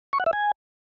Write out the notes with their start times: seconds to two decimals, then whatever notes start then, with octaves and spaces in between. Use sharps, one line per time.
0.13 C#6
0.20 F#5
0.26 E5
0.33 G#5